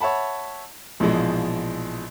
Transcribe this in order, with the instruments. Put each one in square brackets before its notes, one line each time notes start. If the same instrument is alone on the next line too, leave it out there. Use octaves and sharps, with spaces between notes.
[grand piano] C#5 E5 F#5 A5 B5
A#1 B2 E3 F3 G#3